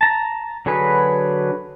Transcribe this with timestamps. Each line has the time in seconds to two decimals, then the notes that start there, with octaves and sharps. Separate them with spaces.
0.01 A5 A#5
0.66 D3 F#3 F#4 G#4 B4